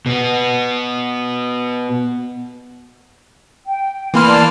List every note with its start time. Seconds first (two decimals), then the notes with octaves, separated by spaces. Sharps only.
0.06 B2 B3
3.65 G5
4.14 E3 A#3 G#5 B5 C6 F6
4.26 D5 A5 C6